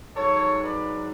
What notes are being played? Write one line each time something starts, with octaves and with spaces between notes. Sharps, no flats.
G#2 F#3 A4 C#5
B4 D5